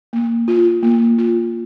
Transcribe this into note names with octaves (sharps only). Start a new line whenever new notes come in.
A#3
F4
A#3
F4